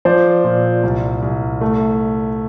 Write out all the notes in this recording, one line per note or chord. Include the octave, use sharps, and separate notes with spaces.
F3 C5 D5
A#2
C2
C2
A3